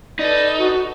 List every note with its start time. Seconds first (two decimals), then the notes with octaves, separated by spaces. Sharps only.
0.19 D#4 A4 B4 D5
0.58 F#4